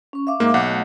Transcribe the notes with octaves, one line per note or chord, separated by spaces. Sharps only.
C#4 C#6
E5 F5 D6
G#2 A#3
B1 F#5
A3 D#5